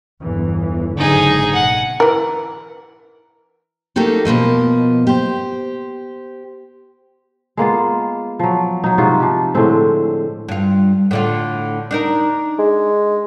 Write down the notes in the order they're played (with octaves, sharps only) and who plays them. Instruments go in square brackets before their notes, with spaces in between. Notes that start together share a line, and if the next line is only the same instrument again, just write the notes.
[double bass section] G1 E2 E3
[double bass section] F#1 G#2 D3 [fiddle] D#4 G#4
[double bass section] B2 [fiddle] F#5
[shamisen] E3 A#4
[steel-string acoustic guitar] A3 A#3 D#4 F#4 G4 A4
B2 F3 A#3 D#5
G4 C5
[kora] G#3 A#3 B3 F4
F3 F#3
F#3 D#4
G#2 C3 F4 F#4
F3 G4
A2 D3 G#3 C4
[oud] G2 F4
A2 D3 F4
D4 D#4 A#4
[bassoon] G#3